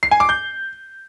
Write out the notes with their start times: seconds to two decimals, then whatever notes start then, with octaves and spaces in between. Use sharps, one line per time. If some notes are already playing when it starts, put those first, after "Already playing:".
0.03 C7
0.11 G#5
0.20 D6
0.29 G6